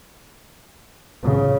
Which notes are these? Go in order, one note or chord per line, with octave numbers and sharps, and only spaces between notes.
C#3